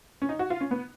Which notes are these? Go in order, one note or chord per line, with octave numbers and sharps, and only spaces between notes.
C#4
D#4
F#4
F4
C#4
B3